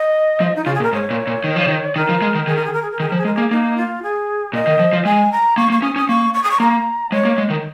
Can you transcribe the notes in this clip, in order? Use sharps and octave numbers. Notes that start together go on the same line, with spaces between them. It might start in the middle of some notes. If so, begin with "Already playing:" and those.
Already playing: D#5
F3
D#4
C#3 F4
G#4
A#2
A#4
G#2 C#5
A#2
A#2
D#3
F3
D#3
D#3 A#4
F3
G#3
D#3
D#3 G#4
A#4
G#4
A#4
G#4
A#4
D#3 G#4
F3 A#4
G#4
G#3 A#4
A#3 G#4
A#3 D#4
F4
G#4
A#2 D#5
D#3
F3
F3
G#3 G#5
A#5
A#3 C#6
A#3 C#6
C#4 D#6
C#4 D#6
A#3 C#6
C#6
D#6
C#6
A#3 A#5
G#3 C#5
A#3
G#3
D#3